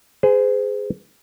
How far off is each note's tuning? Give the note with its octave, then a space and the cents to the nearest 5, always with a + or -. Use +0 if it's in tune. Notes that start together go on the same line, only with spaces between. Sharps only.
G#4 +0 C5 -40